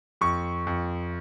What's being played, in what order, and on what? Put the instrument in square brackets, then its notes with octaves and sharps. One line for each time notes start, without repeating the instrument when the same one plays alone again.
[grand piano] F2 C#6
F2